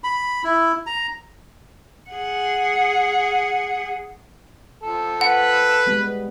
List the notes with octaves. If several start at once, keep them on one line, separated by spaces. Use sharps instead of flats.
B5
E4
A#5
G#4 F#5
F3 A4
B4 F#5
G3 G#3 B3